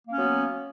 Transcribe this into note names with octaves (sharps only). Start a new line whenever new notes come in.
F#3 A#3 B3 C#4